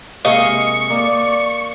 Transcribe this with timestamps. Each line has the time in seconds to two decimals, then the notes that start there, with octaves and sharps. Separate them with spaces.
0.25 C3 G#3 A#3 D#5 F5 C#6
0.90 A#3 D5